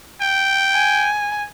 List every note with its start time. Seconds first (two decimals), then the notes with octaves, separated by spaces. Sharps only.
0.21 G5
0.73 G#5